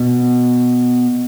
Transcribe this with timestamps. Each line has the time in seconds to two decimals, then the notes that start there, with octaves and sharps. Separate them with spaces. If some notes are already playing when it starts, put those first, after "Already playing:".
Already playing: B2